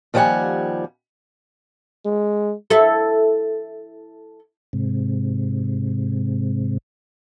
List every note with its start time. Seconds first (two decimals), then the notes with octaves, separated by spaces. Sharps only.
0.14 D#2 F3 G3 C5 F#5 G#5
2.06 G#3
2.70 E4 A4
4.73 G#2 C3